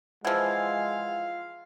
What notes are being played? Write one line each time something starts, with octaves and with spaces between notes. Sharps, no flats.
E3 F3 G#3 F4 F5 F#5 E6 G#6